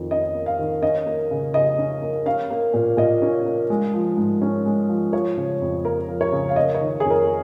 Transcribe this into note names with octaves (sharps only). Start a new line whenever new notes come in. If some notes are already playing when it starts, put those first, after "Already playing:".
Already playing: F2 D#3
C#4 D#5
A#3
F5
D#3
C#4 D#5
A#3
C#3
C#3 D#5
C#4
A#3
C#4 F5
A#3
A#2
A#2 D#5
C#4
A#3
G#3
F3
G#2
C#4
G#3
F3
F3 C#5
C#3
F2
A#3 A#4
F3
C#5
C#3
F5
A#3 D#5
C#5
D#3
F2 G#4
A#4